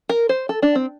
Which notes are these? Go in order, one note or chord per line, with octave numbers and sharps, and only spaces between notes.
A#4
C5
A4
D4
C4